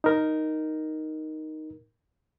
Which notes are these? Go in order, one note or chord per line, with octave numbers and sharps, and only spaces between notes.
D#4 A#4